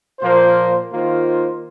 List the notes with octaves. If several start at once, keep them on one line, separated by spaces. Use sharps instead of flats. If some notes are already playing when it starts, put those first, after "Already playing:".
A#2 F3 A#3 F4 C5
D#3 A#3 F4 C5